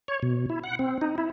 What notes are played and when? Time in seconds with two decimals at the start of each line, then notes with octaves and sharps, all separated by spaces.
0.08 C#5
0.22 B2
0.50 E4
0.64 F#5
0.79 C4
1.01 D#4
1.18 E4